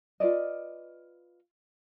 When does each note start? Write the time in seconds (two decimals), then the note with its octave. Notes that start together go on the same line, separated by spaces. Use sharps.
0.20 F4 B4 D5 D#5